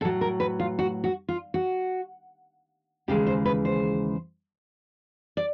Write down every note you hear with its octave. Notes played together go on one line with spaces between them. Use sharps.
A2 F#3 A4
A#4
B4
F4
F#4
F#4
F4
F#4
D#2 C#3 E3 G#3 G4
C5
B4
C5
D5